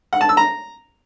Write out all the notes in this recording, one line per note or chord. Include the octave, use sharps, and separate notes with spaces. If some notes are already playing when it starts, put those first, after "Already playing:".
F#5
A5
E6
A#5